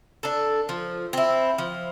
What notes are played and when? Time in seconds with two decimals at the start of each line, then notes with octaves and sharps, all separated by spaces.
0.23 D4 A4
0.69 F3
1.13 C4 E4
1.58 F3